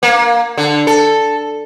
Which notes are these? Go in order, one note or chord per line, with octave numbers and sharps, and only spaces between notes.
A#3
D3
A4